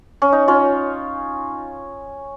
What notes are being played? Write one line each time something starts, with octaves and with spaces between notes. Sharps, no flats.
C#4
D#4
C#4 F4